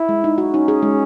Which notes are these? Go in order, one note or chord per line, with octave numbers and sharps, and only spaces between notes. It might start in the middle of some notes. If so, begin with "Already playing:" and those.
Already playing: E4
G#3
D#4
F#4
C#4 D#4
G#4
G#3